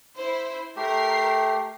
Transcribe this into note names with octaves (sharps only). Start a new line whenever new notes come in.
E4 C5
A3 G4 A#4 C7